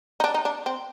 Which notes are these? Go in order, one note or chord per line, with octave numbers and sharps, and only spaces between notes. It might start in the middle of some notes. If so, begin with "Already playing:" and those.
D#4
D4
D#4
D4
C4